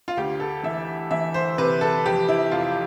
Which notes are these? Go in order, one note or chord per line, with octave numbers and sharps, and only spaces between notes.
F4
D2 G4
A4
E3 E5
E3 E5
C5
C3 B4
A4
F2 G4
E4
F1 F4